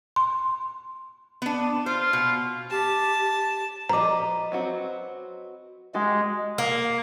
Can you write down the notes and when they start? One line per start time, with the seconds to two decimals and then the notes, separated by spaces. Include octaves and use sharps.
0.16 C6
1.42 B3 D4
1.86 F4 C5
2.13 B2
2.71 G4 A5
3.89 F3 B4 C5 D#5 A#5 D6
4.52 F#3 C4 F#4
5.94 G#3 F#4 G4
6.58 A#3